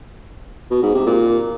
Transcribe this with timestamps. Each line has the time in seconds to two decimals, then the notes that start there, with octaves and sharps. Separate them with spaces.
0.71 B2
0.83 G#2
0.95 C3
1.07 A#2